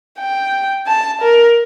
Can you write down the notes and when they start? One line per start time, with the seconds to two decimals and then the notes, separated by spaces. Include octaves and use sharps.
0.19 G5
0.87 A5
1.21 A#4